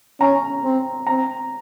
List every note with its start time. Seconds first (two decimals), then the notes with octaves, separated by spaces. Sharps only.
0.20 C#4 A#5
0.64 C4
1.07 C4 A#5